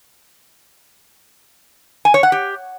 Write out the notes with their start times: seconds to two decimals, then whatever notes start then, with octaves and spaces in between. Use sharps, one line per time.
2.05 G#5
2.14 C#5
2.23 F#5
2.32 G4